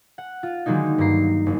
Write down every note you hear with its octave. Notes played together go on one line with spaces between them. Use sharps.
F#5
F4
D3 D#3 F#3 G#3 A#3 D#4
G2 A#3 A#5 C7
F#1